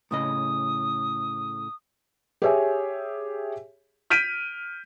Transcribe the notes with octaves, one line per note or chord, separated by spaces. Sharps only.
A2 C#3 D#5 D#6
G4 G#4 C#5 E5 G#5
F6 G6 B6 D7 D#7